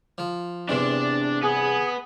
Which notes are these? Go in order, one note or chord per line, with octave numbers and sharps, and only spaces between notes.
F3
E2 G2 C3 D4 D5
B3 G#4